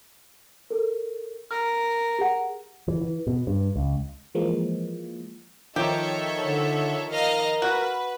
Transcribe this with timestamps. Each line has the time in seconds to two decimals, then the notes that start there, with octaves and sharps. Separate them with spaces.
0.70 A4 A#4
1.51 A#4 F6
2.19 G4 G#4 F#5
2.88 E3
3.01 E3
3.27 B2
3.47 G2
3.76 C#2
4.35 E3 F3 G#3 A#3
5.76 D#3 F3 D#4 G4 A4 C#5 E5
6.44 D3
7.11 A#4 D#5 F5 F6
7.62 F#4 B4